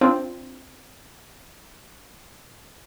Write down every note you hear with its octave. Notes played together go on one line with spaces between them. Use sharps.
C4 D4 F4